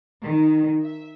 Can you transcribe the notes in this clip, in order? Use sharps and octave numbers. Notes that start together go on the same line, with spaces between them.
D#3
E5